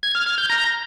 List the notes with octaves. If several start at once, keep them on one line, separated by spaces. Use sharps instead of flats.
G#6
F6
F6
G6
A#5